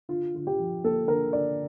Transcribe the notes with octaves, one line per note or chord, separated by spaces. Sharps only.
D3 F4
D3 F4
G4
F3
A#3 A4
D3 A#4
D3 D5